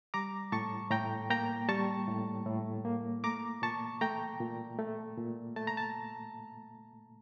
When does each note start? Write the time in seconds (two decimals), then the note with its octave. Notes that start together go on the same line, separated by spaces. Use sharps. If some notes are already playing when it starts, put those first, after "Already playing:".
0.14 G3 A#5 D6
0.52 A2 A5 C#6
0.91 A2 G5 A#5
1.30 A#3 G5 A#5
1.69 G3 A5 C#6
2.08 A2
2.46 A2
2.85 A#3
3.24 A3 A#5 D6
3.62 A#2 A5 C#6
4.01 A3 G5 A#5
4.41 A#2
4.78 A3
5.17 A#2
5.56 A3 A5
5.67 A#5
5.77 A5